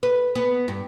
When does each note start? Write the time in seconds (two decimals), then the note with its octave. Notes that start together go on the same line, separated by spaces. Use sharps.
0.03 B4
0.35 B3
0.68 G2